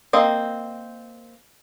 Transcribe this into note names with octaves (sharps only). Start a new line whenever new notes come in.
A#3 C4 D#5